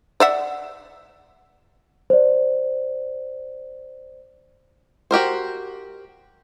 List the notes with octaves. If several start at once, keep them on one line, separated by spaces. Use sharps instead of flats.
D5 E5 F#5
C5 D5
F#4 G4 A#4 C5